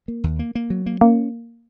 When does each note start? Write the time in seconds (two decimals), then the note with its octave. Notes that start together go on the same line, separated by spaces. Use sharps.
0.08 A#3
0.24 D#2
0.39 A#3
0.55 A#3
0.70 F#3
0.86 A#3
1.01 A#3 C#4